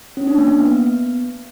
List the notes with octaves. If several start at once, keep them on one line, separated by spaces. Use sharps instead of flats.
C#4
D4
A#3
A#3
B3